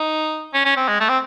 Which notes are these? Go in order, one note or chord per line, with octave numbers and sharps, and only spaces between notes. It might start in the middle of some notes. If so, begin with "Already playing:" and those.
Already playing: D#4
C#4
C#4
C4
G#3
A3
C4